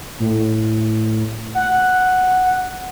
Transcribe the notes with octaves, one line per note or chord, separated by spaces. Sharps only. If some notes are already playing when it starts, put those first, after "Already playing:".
A2
F#5